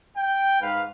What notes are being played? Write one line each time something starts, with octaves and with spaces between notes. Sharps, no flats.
G5
G#2 B4 F5